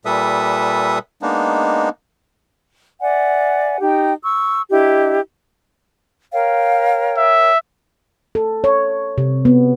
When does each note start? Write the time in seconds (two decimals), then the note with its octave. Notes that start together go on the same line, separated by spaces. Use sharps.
0.05 A#2 G3 A4 B4 E5 D#6
1.22 G#3 A#3 B3 D4 D#4
3.02 D5 E5 F#5 G#5
3.80 D#4 G4 G5
4.23 C#6 E6
4.71 D4 E4 G4 D#5
6.33 A#4 C#5 F5 G5
7.17 E5
8.35 A4
8.64 C#5
9.18 C3
9.45 B3